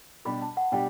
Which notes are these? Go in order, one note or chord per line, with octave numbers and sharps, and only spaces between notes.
B2 G3 D4 G4 B5
A5
F#5
B2 G3 D4 G4 G5